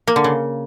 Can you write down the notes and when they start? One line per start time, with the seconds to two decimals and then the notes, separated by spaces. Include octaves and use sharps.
0.07 A#3
0.16 D3
0.24 C#3